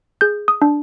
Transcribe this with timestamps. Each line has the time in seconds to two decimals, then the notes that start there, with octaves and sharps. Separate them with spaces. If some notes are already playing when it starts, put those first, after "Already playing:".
0.21 G#4 G6
0.48 D#6
0.62 D4